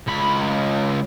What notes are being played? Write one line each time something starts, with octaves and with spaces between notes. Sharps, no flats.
C#2 B5